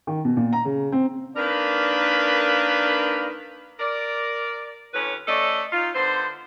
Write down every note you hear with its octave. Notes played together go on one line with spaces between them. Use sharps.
D#3
B2
A#2
A#5
C#3
C4
D#3 A#3 D4 A#4 B4
A#4 D5
D2 A2 C#4 B4
A3 C#4 A4 D5 D#5
D#4 F4
D3 B3 C5